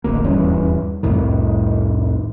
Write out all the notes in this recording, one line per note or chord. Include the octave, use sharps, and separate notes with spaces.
D1 A1 D2 A#3
D#1 E2 G2 C#4
C2 F2 A2 D#3